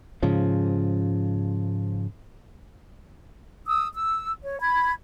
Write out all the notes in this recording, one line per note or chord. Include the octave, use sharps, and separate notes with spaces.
G#2 C#3 F3
D#6 E6
E6
C#5
B5 G#6